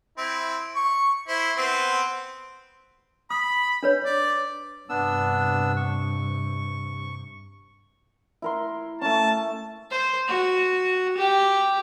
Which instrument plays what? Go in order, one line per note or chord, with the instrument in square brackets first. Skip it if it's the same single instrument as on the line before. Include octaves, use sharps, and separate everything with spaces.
[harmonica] C4 E4
C#6
E4 C5
B3 C4 C5
[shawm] B5 [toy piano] D#6
[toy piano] D4 B4 C#5
[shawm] D5
[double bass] G2 C3 [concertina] B3 D4 E6
[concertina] C#6
[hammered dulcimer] E4 A#4 C6
[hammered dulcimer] A3 C#4 [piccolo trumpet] A5
[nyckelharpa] C5
F#4
G4